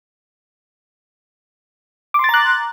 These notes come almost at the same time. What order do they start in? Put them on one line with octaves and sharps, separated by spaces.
D6 C6 A6 A#5 F#6